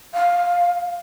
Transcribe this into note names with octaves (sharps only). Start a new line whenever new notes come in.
F5